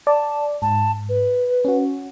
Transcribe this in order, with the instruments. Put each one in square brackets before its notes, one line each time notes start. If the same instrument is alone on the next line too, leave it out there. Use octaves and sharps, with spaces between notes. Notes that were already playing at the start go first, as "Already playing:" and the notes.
[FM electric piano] D5 [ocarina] A5
[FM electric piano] G#2 [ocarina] A5
[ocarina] B4
[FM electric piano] C#4 F#4